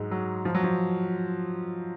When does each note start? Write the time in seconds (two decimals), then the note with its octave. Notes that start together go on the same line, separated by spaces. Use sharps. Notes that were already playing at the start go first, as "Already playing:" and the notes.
Already playing: G#2 F#3 G#3
0.11 F#3
0.45 F3
0.55 F#3
0.64 F3